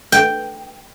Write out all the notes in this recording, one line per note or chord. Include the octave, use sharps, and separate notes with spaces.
G5